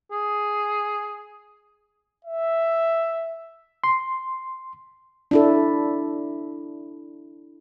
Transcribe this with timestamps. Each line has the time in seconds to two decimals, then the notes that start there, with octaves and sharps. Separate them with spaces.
0.11 G#4
2.25 E5
3.84 C6
5.31 D4 E4 A4